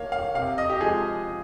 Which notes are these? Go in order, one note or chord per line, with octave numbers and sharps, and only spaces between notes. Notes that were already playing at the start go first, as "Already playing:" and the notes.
Already playing: D#3 A#3 C#5 F5
F5
C3 F5
D#5
G4
F3 G#3 G#4